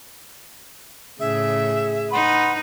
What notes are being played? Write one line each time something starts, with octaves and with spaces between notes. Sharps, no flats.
A2 C#3 G#4 E5
D#4 B4 F#5 B5 C6